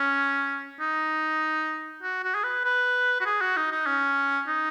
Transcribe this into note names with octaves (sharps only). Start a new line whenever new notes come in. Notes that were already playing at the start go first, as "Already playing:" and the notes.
Already playing: C#4
D#4
F#4
F#4
G#4
B4
B4
F#4
G#4
F#4
D#4
D#4
C#4
D#4